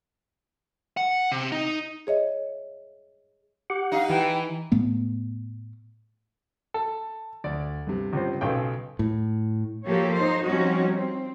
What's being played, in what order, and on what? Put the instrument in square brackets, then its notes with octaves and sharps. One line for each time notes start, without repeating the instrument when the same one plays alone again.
[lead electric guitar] F#5
C3
D#4
[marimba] G#4 C#5 D#5 E5
[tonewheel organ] G4 F#5
[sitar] D#4 [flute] F5
[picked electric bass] E3 [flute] G5
[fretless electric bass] A2 A3 B3
[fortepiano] A4
[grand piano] D2 [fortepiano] D5
[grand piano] G2 C3
[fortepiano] C#2 C5
[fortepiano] B1 C#3 G5 [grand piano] G#4 A4
[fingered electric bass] A2
[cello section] F3 F#3 A#3 G4 A4 C#5
D#4 C5
F3 G3 C4 C#4 D#4 F#4
C4